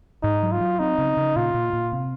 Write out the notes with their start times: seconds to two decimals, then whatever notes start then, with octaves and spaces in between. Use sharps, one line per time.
0.23 G#2 D#4
0.43 F#3
0.52 F4
0.61 F#3
0.79 C4 D#4
0.98 C#3
1.17 C#3
1.36 A#2 F4
1.54 A#2
1.73 A#2
1.92 C3